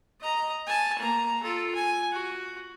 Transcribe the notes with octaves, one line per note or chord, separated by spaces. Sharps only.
D#5 A#5
G#5 A5
A#3 A#5
F4 A4
G#5
F#4